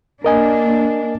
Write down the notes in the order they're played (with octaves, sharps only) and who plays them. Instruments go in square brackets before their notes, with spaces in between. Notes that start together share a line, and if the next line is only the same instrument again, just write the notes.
[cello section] A#3 D4 [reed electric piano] A#4 D#5 G#5